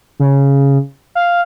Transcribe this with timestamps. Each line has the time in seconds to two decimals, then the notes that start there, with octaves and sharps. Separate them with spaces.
0.20 C#3
1.15 F5